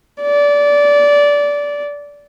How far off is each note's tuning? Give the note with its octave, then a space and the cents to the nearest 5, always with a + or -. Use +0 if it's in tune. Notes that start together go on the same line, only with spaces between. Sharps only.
D5 -20